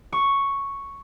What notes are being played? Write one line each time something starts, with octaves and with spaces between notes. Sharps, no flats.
C#6